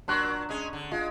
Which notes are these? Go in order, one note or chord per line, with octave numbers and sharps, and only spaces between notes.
A#2 F#3 D4 C6 C#6 F#6
G#3 C#4 G#4
D3
G#3 F4